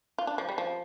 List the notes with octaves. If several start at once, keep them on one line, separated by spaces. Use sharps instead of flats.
F4
D4
F3
G3
F3